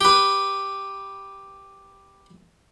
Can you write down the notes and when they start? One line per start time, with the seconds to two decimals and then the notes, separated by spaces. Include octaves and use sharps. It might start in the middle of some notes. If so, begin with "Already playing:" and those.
0.01 G4 B4